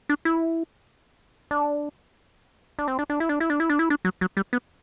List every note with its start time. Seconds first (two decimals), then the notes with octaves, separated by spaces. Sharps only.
0.09 D4
0.25 E4
1.51 D4
2.79 D4
2.88 C4
2.99 D4
3.10 D4
3.20 E4
3.29 D4
3.40 E4
3.50 D4
3.60 E4
3.70 D4
3.79 E4
3.90 D4
4.05 F#3
4.21 F#3
4.37 G3
4.53 B3